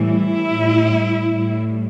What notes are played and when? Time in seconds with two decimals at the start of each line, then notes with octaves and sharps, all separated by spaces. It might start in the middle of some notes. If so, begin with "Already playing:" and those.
Already playing: A2 E3 G3
0.08 E4
0.49 A2 G3
1.31 A2 G3